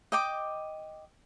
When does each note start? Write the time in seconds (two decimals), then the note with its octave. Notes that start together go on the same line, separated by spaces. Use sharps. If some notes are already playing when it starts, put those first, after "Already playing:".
0.12 D#5 G5 D6